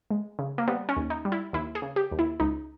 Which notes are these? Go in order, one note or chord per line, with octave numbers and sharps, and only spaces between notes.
G#3
C#3
A#3
G3 B3
C#4
D#2
D#4
G3
E4
D#2 E4
G#4
C#3
G4
D#2
E4
C#2 D#4